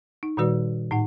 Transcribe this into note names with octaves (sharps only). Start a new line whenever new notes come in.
D#4
A#2 D#3 G3 F#4 B4 D5
A2 D#4 F#5